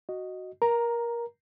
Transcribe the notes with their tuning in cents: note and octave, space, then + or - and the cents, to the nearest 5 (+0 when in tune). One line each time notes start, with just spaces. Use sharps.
F#4 +0 D#5 +0
A#4 +20 A#5 +0